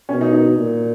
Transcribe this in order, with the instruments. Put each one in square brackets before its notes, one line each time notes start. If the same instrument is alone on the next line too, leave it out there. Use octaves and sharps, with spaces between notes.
[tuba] B2 [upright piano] C#4
[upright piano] D#4
D#4
[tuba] A#2